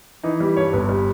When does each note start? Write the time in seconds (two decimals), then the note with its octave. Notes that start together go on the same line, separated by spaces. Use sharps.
0.23 E3 D#4
0.40 G3
0.57 G2 C#5
0.73 G1 B4
0.89 G3